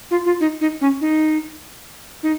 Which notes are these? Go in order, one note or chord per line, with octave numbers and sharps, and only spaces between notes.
F4
F4
D#4
D#4
C#4
D#4
D#4